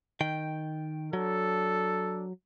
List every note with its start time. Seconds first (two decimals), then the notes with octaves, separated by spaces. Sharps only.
0.21 D#3 G5
1.13 F#3 D4 A4